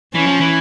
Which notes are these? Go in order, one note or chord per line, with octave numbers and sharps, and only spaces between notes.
E3 C#4
F3
E3